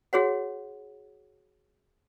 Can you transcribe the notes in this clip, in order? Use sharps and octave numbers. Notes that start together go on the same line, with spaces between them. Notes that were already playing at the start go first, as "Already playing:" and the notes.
F#4 G#4 C#5 F#5